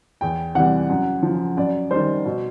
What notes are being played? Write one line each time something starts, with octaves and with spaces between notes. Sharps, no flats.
E2 G5
C3 E3 G3 F#5
F#2
C#3 F3
F#2 D5
D#3 G3 C5
B2